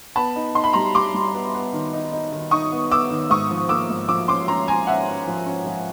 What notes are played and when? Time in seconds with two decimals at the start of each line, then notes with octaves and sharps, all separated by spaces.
0.16 B3 A5 B5
0.36 D#4
0.55 D#4 C6
0.64 B5
0.73 G3 A#5 C6
0.94 G3 C6 D6
1.14 G3
1.34 B3
1.54 B3
1.73 D#3
1.93 D#4
2.12 D#4
2.32 D#3
2.51 D#4 C#6 D#6
2.72 B3
2.91 B3 D6 E6
3.10 D#3
3.30 G#2 C#6 D#6
3.51 F3
3.69 A#3 D6 E6
3.90 G#2
4.08 F3 D6 E6
4.28 C#4 C6 D6
4.48 C#4 A#5 C6
4.67 C#4 G#5 A#5
4.87 C#4 E5 F#5
5.07 C#4
5.27 F3
5.46 C#4
5.66 F3